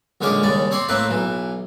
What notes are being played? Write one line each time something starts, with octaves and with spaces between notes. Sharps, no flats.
A#1 D3 G#3 C#4 F5 D6
D#2 C#3 G3 D5 C#6
C4 C#5 D5 C6
A2 A#3 C4 B4 E5
B1 E3